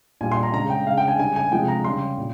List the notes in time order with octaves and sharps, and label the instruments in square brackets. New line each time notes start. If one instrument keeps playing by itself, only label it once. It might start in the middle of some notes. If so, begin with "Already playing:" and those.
[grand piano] A#2 G3 G#5
C6
A#5
C#3 G#3 A#5
G5
G#3 F5
C#3
G5
G#5
C#3 G3 G#5
G#5
C3 F3 G#3 G5
A#5
C#3 G3 C6
A#2